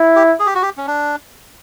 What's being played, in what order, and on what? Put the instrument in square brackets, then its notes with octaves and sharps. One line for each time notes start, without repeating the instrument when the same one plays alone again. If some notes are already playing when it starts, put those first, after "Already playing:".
Already playing: [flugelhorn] E4
[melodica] G4
G#4
G4
F#4
G4
C#4
D4